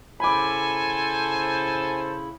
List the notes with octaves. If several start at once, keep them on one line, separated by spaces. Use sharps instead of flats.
C#3 E4 A4 C5 G#5 B5 D6